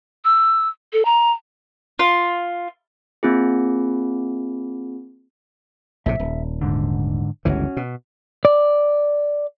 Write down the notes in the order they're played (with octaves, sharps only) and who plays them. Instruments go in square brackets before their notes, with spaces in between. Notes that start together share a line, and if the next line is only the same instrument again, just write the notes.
[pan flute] E6
A4
A#5
[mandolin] F4
[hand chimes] A#3 C4 F4 G#4
[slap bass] A#1 A2 C3 [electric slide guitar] E5
[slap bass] D#1
[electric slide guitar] G#2 D3
[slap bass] G1 C#2 E3 [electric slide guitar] C#4 F#4
[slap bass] B2
[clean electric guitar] D5